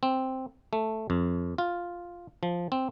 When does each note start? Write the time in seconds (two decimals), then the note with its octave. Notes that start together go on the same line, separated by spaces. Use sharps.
0.03 C4
0.73 A3
1.10 F2
1.58 F4
2.43 F3
2.72 C4